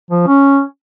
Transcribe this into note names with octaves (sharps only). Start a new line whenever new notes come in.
F3
C#4